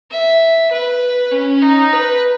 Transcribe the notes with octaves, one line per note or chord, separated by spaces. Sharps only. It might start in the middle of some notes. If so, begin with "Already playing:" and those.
E5
B4
C#4
D#4
B4